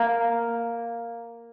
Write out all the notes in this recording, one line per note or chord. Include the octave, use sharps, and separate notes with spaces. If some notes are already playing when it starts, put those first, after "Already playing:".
Already playing: A#3